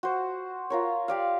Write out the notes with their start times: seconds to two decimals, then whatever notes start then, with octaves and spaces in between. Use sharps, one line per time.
0.03 F#4 C5
0.70 F4 A#4 C#5
1.08 G4 D5 F5